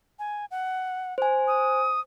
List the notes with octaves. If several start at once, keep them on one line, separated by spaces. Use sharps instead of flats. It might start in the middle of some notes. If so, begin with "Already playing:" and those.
G#5
F#5
C5 G#5
D#6